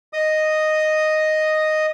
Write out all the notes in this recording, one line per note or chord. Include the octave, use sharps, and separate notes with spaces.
D#5 D#6